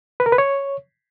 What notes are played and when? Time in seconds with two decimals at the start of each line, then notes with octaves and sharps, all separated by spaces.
0.20 B4
0.26 A#4
0.32 B4
0.38 C#5